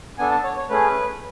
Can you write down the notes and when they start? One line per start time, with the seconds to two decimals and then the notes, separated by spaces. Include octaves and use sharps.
0.18 B3 D4 A4 G#5
0.31 A5
0.44 C#5
0.57 C#5
0.69 A3 C#4 G#4 B4